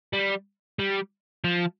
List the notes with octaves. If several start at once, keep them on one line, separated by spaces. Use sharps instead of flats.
G3
G3
F3